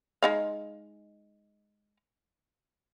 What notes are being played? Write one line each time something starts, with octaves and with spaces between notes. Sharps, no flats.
G#3 D#4 F5